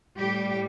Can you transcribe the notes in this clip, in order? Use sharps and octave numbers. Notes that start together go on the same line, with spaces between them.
A2 G3 G4